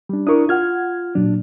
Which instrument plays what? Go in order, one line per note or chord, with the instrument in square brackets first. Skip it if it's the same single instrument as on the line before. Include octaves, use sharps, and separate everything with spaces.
[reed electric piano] G3 D4
[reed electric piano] D4 E4 A#4 [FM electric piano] C#6 D#6
[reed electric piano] F4 F6 [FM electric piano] F#5 G#6
[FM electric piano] A#2 F#3 [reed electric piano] D4